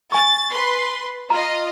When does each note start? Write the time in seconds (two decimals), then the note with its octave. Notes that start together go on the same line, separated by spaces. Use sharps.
0.12 G#5 C#6 A6
0.51 B4 C6
1.30 F4 D#5 A#5